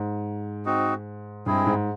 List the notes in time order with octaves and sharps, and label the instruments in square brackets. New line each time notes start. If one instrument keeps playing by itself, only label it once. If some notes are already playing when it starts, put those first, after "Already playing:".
Already playing: [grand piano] G#2
[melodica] C4 D#4 F#4
[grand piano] G2 [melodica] G#3 C4 E4 G#4
[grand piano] G#2